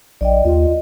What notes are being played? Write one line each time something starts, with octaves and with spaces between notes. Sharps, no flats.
A#1 D5 D#5 G5
D#2 F4 D#5